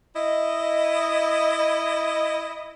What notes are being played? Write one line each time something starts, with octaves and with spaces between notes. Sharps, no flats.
E4 D#5